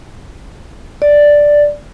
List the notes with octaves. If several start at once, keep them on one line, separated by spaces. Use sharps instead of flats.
D5